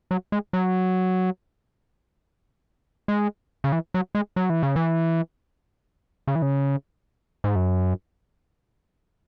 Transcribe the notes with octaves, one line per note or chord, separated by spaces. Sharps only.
F#3
G#3
F#3
G#3
C#3
E3
F#3
G#3
F#3
E3
C#3
E3
C#3
E3
C#3
G#2
F#2